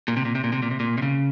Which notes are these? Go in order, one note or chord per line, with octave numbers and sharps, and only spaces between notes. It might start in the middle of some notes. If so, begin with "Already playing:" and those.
A#2
C3
A#2
C3
A#2
C3
A#2
C3
A#2
C3
C#3